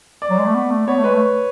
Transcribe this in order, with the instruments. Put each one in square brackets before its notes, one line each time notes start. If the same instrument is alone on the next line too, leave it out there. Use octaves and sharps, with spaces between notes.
[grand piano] D5
[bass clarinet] F#3
G#3
A3
B3
A3
[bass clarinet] B3 [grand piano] C#5
[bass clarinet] A3
[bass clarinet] G#3 [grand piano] B4
[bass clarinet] A3